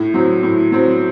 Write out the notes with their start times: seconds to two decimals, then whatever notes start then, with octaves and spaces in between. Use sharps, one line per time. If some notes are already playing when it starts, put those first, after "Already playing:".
Already playing: A2
0.14 F#3 C4
0.43 A2
0.72 F#3 C4